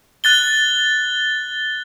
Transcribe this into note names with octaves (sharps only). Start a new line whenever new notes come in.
F#6 A6 G7